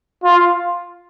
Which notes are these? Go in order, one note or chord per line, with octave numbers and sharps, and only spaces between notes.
F4